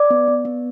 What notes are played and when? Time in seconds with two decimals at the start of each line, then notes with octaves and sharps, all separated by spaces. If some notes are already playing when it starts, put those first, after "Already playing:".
Already playing: D5 D6
0.10 B3
0.28 B3
0.45 B3